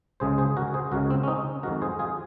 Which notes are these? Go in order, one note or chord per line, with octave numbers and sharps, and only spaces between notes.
C#2 C#3 G#3 G#4 C5
G#4 C5
F#4 A#4
G#4 C5
C#2 C#3 G#3 F#4 A#4
C4
C#4
C4 D#4
F2 D#3 G#3 F#4 A#4
G#4 C5
F4 G#4